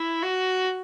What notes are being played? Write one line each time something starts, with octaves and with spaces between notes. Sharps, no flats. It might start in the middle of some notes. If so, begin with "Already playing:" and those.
Already playing: E4
F#4